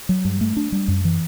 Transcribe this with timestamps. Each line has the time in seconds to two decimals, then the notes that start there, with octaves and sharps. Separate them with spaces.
0.09 F#3
0.25 G2
0.41 A3
0.57 D4
0.72 G3
0.88 F#2
1.05 E3